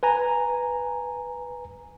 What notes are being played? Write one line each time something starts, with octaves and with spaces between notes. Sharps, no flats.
B4 G#5 A#5